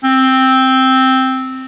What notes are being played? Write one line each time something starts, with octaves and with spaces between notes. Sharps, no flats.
C4